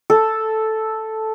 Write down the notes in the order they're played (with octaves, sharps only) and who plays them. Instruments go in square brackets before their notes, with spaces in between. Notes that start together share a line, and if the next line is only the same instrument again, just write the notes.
[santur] A4